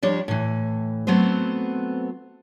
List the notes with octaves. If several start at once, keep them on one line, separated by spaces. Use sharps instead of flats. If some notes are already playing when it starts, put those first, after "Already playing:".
F3 G3 D4 C#5
A2 E3
F#3 A3 B3 C4 C5